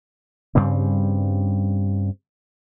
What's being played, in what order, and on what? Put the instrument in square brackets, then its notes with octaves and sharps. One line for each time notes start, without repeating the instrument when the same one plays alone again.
[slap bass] G2 C#3 G3 C4